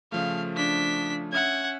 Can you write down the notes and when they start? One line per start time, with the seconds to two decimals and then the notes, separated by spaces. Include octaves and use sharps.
0.12 C#3 F3 A3 F5
0.56 D4 B6
1.33 C#4 E5 F#5 G#6